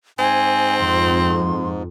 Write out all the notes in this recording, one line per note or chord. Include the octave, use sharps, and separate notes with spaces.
G#2 C4 G#5
F2 C6